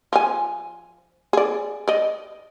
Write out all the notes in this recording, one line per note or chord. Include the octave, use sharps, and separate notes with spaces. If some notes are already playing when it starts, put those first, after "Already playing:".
F3 G#5
G#4 D5
D5 D#5